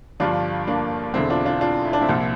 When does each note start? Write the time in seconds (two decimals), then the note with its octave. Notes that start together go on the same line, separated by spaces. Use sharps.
0.20 G1 G2 F3 D4 F4
0.67 A#3 D4
1.14 E1 E2 D3 C4 E4
1.30 D4 F4
1.46 D4 F4
1.61 D4 F4
1.85 E4
1.93 D4
2.01 C4 E4
2.09 C2 A#2 F3